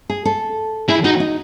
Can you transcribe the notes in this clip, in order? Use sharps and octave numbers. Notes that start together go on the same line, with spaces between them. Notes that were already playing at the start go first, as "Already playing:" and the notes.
G#4
A4
E4 G#4
D#4 F#4
D#4